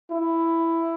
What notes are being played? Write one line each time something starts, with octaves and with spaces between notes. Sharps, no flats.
E4